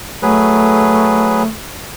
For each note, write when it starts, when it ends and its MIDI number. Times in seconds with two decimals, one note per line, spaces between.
0.22 1.43 54
0.22 1.47 57
0.22 1.43 68
0.22 1.43 71